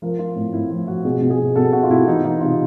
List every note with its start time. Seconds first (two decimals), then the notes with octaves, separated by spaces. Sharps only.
0.02 F3 A#4
0.19 F3 F4
0.36 A2
0.53 A2 E4
0.70 F3 F4
0.87 F3 F#4
1.04 B2 G#4
1.22 B2
1.30 G#4
1.39 B2
1.55 B2 A4
1.72 B2 F#4
1.83 F4
1.90 B2 E4
2.07 E3 D#4
2.24 E3 D#4
2.41 C3 F4